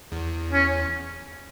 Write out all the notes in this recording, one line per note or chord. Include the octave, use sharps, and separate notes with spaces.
E2
C#4